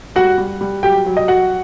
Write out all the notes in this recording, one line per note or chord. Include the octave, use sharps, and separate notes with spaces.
G3 F#4 F#5
G3
G3
F#3 G4 G5
F#3
D#5
F#3 F#4 F#5